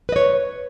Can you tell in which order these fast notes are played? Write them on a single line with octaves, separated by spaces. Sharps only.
B4 D#5 C#5